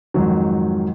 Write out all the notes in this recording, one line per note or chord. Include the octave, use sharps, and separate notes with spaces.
F2 G#2 D#3 F#3